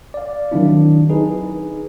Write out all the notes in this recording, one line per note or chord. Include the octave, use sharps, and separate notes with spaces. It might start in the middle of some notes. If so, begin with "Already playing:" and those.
D5 F5
D#3 F#3 C4 D4 E4
D#4 G#4 B4